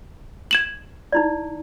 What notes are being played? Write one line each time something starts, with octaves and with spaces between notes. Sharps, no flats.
G#6 E7 F#7
D#4 E4 D5